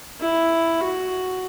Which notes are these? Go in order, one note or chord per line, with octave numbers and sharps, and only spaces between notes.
E4
F#4